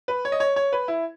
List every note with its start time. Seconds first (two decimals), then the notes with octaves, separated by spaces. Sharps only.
0.08 B4
0.25 C#5
0.32 D#5
0.40 C#5
0.56 C#5
0.73 B4
0.88 E4